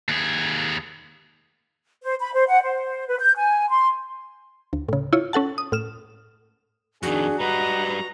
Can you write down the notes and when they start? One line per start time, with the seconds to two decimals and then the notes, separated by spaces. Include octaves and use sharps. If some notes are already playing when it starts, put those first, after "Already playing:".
0.09 D#2 G#4
2.03 C5
2.21 B5
2.33 C5
2.49 F#5
2.62 C5
3.08 B4
3.20 G6
3.36 G#5
3.69 C6
4.73 D2
4.89 A2 C#3
5.13 E4 F4 C#5
5.33 C#4 A4 F#5 A5
5.58 D#6
5.72 A2 F6 E7
7.03 F2 D#3 D4 F#4 G#4
7.40 G3 B4 D#5 F#5 A#5